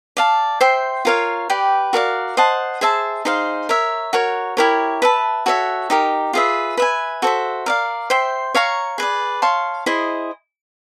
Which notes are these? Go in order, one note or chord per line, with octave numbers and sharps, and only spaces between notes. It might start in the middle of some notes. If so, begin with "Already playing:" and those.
D5 F5 A5
C5 E5 G5 C6
F4 A#4 C#5 F5
G4 B4 D5 G5
F#4 A#4 D5 F5
C5 D#5 F#5 A5
G#4 C5 E5 A5
D#4 G#4 C5 F5
A#4 C#5 E5
F#4 A#4 C#5
E4 G4 A#4 C#5
B4 E5 A5
F#4 A4 C#5 E5
D#4 G4 A#4
F4 G#4 B4 E5
B4 E5 G#5
F#4 A4 C5 E5
A#4 D5 F5
C5 E5 G5 C6
C#5 F5 A#5 C#6
G#4 B4 D5
C#5 F5 A5 C6
E4 G#4 C5 D#5